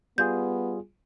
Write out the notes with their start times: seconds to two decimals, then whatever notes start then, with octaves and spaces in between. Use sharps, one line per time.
0.18 G3 B3 F4 G#4 G6